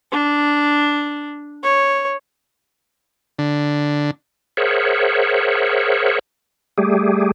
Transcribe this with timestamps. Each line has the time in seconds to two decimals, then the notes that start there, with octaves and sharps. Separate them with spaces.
0.12 D4
1.63 C#5
3.39 D3
4.57 G#4 A#4 C5 C#5 E5 F#5
6.78 G3 A3 G4 G#4